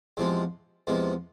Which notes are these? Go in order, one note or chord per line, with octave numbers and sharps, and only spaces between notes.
E2 C3 F3 G#3
E2 C3 F3 G#3